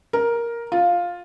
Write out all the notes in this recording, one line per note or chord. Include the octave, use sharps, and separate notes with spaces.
A#4
F4